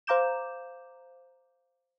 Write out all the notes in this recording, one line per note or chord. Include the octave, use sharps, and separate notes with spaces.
C5 F5 A#5 D6 G6 E7